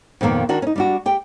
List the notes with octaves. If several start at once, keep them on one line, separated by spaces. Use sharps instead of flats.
F2 A#2 D#3 A#3 B3
D#3 D4 F#4
C#4 D#4
G3 D4 F#4
G4 G5